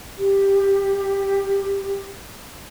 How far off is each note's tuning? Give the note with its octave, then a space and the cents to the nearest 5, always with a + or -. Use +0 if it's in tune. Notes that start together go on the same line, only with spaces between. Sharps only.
G4 +5